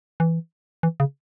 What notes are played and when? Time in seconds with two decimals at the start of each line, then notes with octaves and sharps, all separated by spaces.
0.20 E3
0.83 E3
1.00 C#3